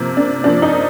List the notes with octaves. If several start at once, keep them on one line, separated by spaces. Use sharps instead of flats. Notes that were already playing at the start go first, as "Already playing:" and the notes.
Already playing: C3 F3 A#3
D4
C3 F3 A#3 D4
D#4